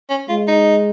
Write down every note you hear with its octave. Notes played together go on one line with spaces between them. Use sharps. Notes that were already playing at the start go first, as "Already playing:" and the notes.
C#4
G#3 F4
D#4